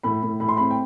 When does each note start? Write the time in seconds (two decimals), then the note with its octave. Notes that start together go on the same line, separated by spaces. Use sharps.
0.04 A2 B5
0.23 A2
0.40 A2 B5
0.48 C6
0.57 C4 B5
0.71 G5